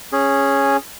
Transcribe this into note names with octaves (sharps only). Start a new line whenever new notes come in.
C#4 G#4